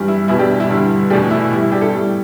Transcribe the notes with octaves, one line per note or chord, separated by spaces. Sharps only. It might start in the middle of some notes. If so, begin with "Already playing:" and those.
Already playing: G2 E3 G3
E4
E2 B2 G3 E4
D4 G4
E4
G2 D3 G3
E2 B2 A3 D4 G4
E4
A2 G3
E4
D4 G4
E4 A4
A2 G3